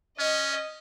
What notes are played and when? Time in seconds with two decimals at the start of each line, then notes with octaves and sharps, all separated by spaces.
0.19 C#4 D#5